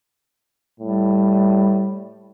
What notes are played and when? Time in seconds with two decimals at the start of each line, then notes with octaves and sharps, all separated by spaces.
0.80 A2 G3